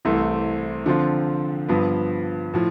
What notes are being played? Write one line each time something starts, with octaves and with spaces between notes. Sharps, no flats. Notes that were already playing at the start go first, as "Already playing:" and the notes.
C2 C3 E3 A3 C4
D3 F3 C4 F4
G2 F3 B3
A2 F3